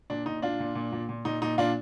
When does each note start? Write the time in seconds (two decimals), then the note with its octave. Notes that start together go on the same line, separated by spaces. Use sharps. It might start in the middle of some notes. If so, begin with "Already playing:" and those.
0.10 A#2 D4
0.26 A#2 D#4
0.42 A#2 D4 F4
0.60 A#2
0.75 A#2
0.92 A#2
1.09 A#2
1.25 A#2 D#4
1.42 A#2 D#4
1.58 A#2 D4 F4